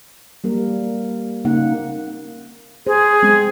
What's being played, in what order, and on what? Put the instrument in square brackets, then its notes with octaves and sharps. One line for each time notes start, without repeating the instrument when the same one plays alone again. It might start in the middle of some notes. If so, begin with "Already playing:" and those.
[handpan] G3 A#3 A#4
C#3 A#3 C4 D#4 F#5
[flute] G#4 [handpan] C5
[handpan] G#3 C4